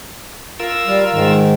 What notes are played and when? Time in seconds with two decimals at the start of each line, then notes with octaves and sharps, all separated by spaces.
0.60 F4 A#4 E6
0.87 G3 F5
1.13 G#2 D#3